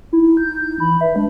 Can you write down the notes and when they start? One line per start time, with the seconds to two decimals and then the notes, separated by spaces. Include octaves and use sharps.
0.13 D#4 E4
0.37 G6
0.56 G6
0.80 E3 B5
1.01 B4 E5
1.16 G#3 D4